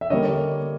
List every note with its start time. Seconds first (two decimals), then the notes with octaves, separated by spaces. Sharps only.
0.01 E5
0.10 D3 G3 A#3 C#5 D#5